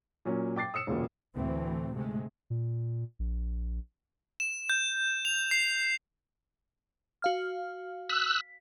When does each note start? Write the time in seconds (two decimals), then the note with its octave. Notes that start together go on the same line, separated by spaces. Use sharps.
0.25 A#2 F#3 C#4
0.56 G5 D6 A6 C7
0.74 D#6 E6 C#7 E7
0.87 E1 C#2 A#2
1.35 D2 A2 E3 A3 C4
1.93 G#2 C3 G#3 A3
2.50 A#2
3.19 A#1
4.40 E7
4.70 G6
5.25 F7
5.51 C7
7.22 F#4 F5 F6
8.09 E6 F#6 B6